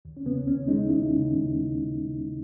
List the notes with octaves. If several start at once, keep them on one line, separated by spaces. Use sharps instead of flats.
D#2
C#4
C#3 B3
D#2 C#4
G#3 D#4
D#2 E4
C#3
D#2